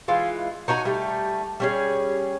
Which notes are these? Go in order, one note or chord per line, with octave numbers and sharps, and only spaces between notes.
E3 G#3 F4
D#4 F#4 G#5 A#5
G3 A3
G3 C#4 G#4